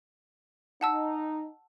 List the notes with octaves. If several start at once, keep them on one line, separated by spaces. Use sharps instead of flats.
D#4 F#5 A5 E6